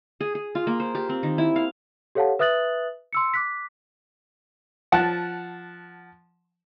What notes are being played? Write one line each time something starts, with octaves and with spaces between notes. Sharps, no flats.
G#4
G#4
F4
A#3
C5
G4
C4
D#3
E4
F5
G4 A4 C#5 F5 F#5 A5
B4 E5 D#6 F#6 A6 F#7
C6 E6 C#7
D6 F#6 B6
F3 F#5 A5